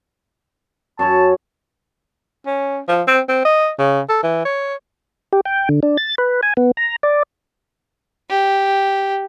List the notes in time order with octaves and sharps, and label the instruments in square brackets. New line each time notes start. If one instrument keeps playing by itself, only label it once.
[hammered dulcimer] F#2 C#4 C#5 [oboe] A5
[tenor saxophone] C#4
F3
C4
C4
D#5
C#3
A4
E3
C#5
[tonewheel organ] G4
G5
D3
D4
A6
B4
G#5
B3
A#5
D5
[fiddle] G4